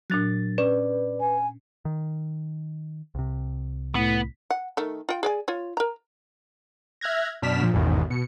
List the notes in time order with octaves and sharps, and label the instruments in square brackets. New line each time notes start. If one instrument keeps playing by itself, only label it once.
[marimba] A#2 D4 F#6 [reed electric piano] F#3 A6
[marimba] C#4 [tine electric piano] B4 [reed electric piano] D5
[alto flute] G#5
[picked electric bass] D#3
C2 C3
[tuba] A2 [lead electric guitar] B3
[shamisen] F#5
D#3 A3
F4 G5
G#4 D5 G#5
F4 C#5
A#4 A#5
[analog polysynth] E5 F6 F#6 G#6 A#6
F#2 B2 D4 F6 B6 E7
A#2 F3
A1 E2 G#2 B2 D#3
B2 C#7